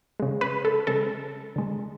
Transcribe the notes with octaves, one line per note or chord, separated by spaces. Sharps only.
C#3 G#3
B4
A4
C#3 G#3 A4
D3 G#3